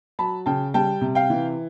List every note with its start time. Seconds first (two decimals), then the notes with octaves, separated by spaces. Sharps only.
0.19 F#3 A5 B5
0.46 C#3 G5 A5
0.74 G3 G5 A5
1.01 C3
1.15 F5 G5
1.30 E3